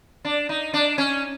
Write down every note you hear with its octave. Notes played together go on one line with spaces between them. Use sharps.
D4
D#4
D4
C#4